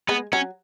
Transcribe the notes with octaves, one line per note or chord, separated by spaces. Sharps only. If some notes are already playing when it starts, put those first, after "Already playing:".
G#3 B3
F#3 C#4